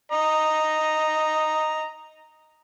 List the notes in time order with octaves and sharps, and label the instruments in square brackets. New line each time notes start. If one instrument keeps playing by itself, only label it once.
[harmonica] D#5 A#5